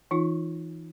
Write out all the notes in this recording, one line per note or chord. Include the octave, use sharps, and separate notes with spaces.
E3 D#4 F4